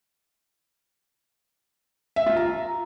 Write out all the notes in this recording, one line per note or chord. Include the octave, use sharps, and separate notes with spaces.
E5
F4
A#5